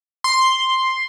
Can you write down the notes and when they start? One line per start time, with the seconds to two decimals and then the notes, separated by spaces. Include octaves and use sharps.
0.24 C6